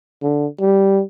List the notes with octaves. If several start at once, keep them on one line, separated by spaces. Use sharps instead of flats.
D3
G3